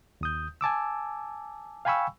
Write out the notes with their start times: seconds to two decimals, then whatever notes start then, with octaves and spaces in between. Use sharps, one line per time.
0.21 D#2 D#6 G6
0.61 G#5 A5 D6 E6
1.85 F5 G5 G#5 B5 C#6 E6